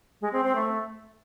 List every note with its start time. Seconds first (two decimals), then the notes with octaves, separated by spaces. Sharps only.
0.21 G#3
0.33 C4
0.44 C4
0.55 A3